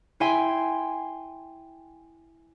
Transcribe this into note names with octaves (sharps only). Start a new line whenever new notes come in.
E4 E5 G5 G#5 C6